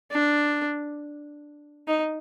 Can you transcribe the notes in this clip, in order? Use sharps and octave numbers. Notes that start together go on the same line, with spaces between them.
D4
D#4